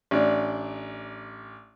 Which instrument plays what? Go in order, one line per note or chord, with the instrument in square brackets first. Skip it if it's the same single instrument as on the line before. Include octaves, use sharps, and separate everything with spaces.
[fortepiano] A1 D4 D5